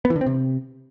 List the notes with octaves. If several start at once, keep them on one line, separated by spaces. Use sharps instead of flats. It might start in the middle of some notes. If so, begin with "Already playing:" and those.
B3
E3
D3
C4
C3